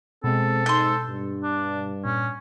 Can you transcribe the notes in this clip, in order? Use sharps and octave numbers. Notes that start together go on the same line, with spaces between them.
B2 G#3 C4 A4
G#2 C6 G6
G2
D4
A#2 C#4